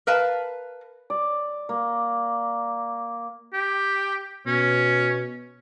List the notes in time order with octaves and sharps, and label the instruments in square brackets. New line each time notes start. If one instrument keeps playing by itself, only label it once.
[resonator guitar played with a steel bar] A#4 B4 F5 A5
[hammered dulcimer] D5
A#3
[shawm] G4
[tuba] B2 [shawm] C#4